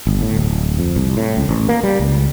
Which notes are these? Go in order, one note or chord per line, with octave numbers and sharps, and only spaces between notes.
G1
A2
D1
F2
C2
A2
C#2
A1
A#3
G3
C#2